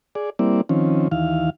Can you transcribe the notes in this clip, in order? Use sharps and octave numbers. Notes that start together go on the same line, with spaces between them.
G#4 D5
G3 A#3 C4 E4 D5
D#3 F3 C4 C#4
D#2 E3 F5